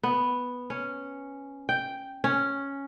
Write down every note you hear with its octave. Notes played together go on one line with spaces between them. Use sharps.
B3
C#4
G5
C#4